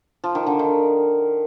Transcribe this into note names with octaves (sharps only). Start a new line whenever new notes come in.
F3
D#3
D3
D#3